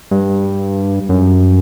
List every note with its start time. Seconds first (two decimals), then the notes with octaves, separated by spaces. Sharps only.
0.11 G2
1.09 F#2